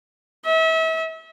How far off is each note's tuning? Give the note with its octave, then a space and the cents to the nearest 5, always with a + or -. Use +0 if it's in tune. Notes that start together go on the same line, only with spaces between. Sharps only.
E5 -35